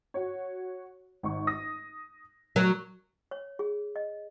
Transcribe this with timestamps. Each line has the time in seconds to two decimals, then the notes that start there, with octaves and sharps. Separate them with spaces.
0.14 F#4 C#5
1.23 G#1 C#6
1.47 D#6 A#6
2.56 F#3 A#4
3.31 C#5
3.59 G#4
3.96 D#5